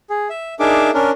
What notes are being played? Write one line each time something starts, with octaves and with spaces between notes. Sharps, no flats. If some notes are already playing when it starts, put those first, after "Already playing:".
G#4
E5
D4 D#4 G#4 A#4 E5 D6
C#4 D4 A#4